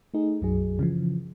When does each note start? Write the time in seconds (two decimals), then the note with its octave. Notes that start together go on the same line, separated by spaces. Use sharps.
0.14 A3 D#4 G#4
0.42 B1 F#2 F#3 G#4
0.79 C#3 E3 F3